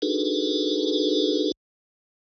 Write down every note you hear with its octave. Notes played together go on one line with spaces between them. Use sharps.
D4 D#4 F#4 G#4 A4 B4